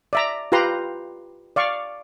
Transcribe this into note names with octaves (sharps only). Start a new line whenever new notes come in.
D5 E5 A#5
F4 G4 B4 A#5 C6
D5 F5 C#6